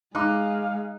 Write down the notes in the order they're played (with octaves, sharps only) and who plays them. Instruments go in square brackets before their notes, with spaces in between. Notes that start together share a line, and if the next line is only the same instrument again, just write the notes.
[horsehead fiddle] G#3 [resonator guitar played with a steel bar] D#4 [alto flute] F5 [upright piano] D6 F#6